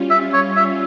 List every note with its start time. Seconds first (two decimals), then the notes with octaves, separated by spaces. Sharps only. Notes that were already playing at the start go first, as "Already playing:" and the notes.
Already playing: G3 C#4 F4
0.11 E5
0.33 C#5
0.56 E5